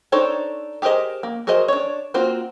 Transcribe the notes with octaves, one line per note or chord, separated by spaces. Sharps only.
D4 D#4 A4 C5 C#5
G4 G#4 A#4 C5 D#5
A#3
F#4 G#4 A#4 C5 D#5
D4 C#5
A#3 C4 F4 F#4 C5